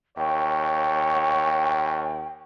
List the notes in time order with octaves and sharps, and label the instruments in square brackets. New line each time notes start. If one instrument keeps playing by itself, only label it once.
[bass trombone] D#2 [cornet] C#5 [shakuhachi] G5